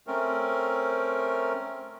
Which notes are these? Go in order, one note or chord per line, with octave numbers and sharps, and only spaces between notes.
A3 C4 C#4 A#4